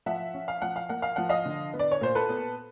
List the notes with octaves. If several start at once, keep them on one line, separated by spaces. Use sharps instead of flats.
F3 E5 F#5
C#4
F5
F3 F#5
F5
A#3 F#5
F5
F3 F#5
D#5 F5
D3
B3
D5
C#5
A#2 C5
A4 B4
B3